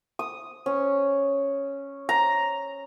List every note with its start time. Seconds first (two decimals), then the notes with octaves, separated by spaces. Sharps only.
0.19 D#6
0.66 C#4
2.09 A#5